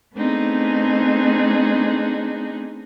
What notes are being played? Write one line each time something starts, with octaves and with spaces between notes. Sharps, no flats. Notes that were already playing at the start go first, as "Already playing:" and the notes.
A3 B3 C4 D4 D#4 G#4